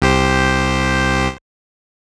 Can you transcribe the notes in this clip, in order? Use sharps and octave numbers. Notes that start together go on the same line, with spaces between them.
C2 G4 C5